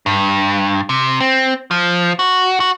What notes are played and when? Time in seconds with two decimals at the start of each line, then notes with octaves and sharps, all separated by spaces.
0.06 G2
0.89 C3
1.20 C4
1.71 F3
2.19 F#4
2.60 F#4